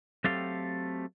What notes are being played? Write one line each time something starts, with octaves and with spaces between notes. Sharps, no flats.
F#3 A3 C4 G4 A4 F5